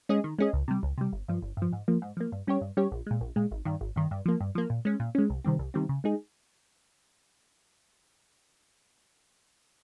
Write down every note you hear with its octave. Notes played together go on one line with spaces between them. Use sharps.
G#3 C#4 G#4 D#5
D#3
G#3 C#4 G#4 D#5
C#2
C3 G3
C#2
C3 G3
G1
G2 F3
G1
G2 F3
G#2
F3 A#3
G#2
F3 A#3
G2
G3 C#4 G4 C#5
G2
G3 C#4 G4 C#5
A#1
A#2 G#3
A#1
A#2 G#3
G#1
G2 D#3
G#1
G2 D#3
G2
F3 A#3
G2
F3 A#3
A#2
G#3 C#4
A#2
G#3 C#4
C2
C3 D#3 G3 C4
C2
C3 D#3 G3 C4
C#3
G#3 D#4 G#4